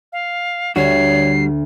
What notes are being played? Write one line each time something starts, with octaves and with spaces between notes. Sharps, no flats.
F5
D2 G3 D4 F#4 C#5 C7